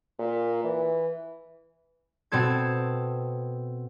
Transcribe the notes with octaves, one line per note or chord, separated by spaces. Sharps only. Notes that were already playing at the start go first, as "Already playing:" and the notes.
A#2
E3
B2 C4 A4 G#6